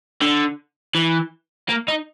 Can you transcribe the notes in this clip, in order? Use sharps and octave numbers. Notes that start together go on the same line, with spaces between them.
D3
E3
A#3
D#4